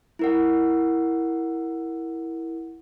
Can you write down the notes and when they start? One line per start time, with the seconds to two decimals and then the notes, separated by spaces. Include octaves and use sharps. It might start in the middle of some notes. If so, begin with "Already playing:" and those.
0.19 E4 A#4 F#5